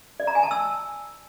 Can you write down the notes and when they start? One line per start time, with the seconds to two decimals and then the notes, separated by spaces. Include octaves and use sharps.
0.20 D5
0.27 A#5
0.35 G#5
0.43 A5
0.51 E6